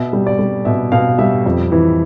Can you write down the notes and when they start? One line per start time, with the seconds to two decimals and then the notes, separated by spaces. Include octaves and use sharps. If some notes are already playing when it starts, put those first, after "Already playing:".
Already playing: B2 E5
0.13 G3
0.27 D5
0.39 G3
0.65 B2 E5
0.92 B2 F5
1.19 G3 E5
1.46 F2
1.72 E3